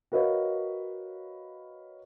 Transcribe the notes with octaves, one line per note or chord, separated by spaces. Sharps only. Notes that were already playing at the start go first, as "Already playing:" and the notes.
F#4 A#4 B4 C#5 D#5 F5